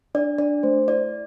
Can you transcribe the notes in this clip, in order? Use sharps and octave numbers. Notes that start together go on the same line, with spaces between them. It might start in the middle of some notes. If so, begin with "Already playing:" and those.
D4 D5
D4 D5
A3 C5
E4 D5